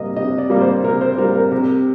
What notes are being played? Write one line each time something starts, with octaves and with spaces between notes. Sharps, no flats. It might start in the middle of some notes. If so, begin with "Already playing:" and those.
Already playing: C3 G3 A#3 D#5
C3 D#5
D5
G3 A#3
C5
C3 A#4
C5
G3 A#3 A#4
A#4
C3 A#4